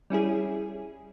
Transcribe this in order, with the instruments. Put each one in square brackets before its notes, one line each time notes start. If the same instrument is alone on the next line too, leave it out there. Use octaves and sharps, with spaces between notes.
[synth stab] G3 C#4 E4 G#4